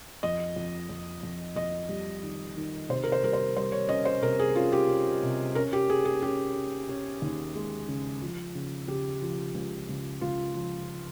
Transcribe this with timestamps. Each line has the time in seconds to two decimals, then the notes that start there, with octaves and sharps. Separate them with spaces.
0.23 F2 D#5
0.56 F2
0.89 F2
1.23 F2
1.56 F2 D#5
1.89 G3
2.23 D#3
2.57 D#3
2.89 C3 C5
3.04 A#4
3.12 C5
3.23 G3 A#4
3.33 C5
3.56 G3 C5
3.72 C#5
3.89 C#4 D#5
4.05 C5
4.22 C3 A#4
4.39 G#4
4.56 C#4 F4
4.72 G4
4.88 C#4
5.23 C3
5.55 C#4 A#4
5.73 G4
5.89 C#4 G#4
6.05 G#4
6.22 C#4 G4
6.56 C#4
6.89 C#4
7.22 D#2
7.56 G#3
7.88 C#3
8.22 F3
8.55 C#3
8.88 C#3 G4
9.22 F3
9.54 C#2
9.89 C#2
10.21 C#2 F4
10.54 F3